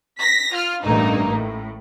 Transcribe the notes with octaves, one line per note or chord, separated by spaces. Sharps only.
A#6 B6
F4 F6
A1 G2 A3 A#3 D#4
A2